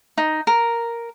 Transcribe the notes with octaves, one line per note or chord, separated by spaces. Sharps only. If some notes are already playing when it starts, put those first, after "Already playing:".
D#4
A#4